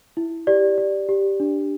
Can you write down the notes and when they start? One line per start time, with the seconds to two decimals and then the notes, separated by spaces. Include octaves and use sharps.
0.17 E4
0.47 G4 D5
0.78 D5
1.09 G4
1.40 D4